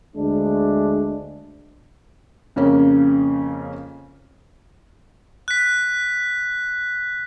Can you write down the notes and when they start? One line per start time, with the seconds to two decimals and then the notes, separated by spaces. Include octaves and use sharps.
0.16 D2 G#3 D4
2.56 F2 C#3 A#3 C#4
5.48 F#6 B6